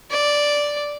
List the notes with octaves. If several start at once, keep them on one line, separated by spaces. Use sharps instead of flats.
D5